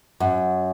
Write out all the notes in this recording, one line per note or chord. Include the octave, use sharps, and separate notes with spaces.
F#2